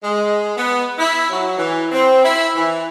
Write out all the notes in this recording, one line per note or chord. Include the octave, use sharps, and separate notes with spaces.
G#3
B3
E4
F#3
E3
C4
E4
E3